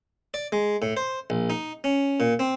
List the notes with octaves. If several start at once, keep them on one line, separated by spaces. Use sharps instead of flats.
D5
G#3
A2
C5
A#1
D#4
C#4
A#2
C4